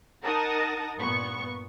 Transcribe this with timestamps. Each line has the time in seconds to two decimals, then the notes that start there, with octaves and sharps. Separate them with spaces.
0.23 D#4 A#4 F#5 A5 D#6 A#6
0.97 G2 A#2 B3 C#6